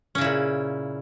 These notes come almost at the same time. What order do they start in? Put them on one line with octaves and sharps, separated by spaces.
C#4 C#3 E4 A#2